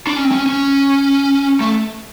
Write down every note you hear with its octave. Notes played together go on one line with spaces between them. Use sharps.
D4
C#4
C4
C#4
C#4
A3